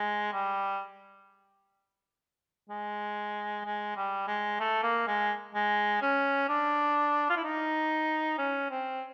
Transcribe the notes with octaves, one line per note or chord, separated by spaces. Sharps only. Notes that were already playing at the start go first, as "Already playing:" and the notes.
Already playing: G#3
G3
G#3
G#3
G3
G#3
A3
A#3
G#3
G#3
C#4
D4
F4
E4
D#4
C#4
C4